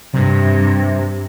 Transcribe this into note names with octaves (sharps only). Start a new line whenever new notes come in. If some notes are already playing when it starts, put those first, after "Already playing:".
G2 C3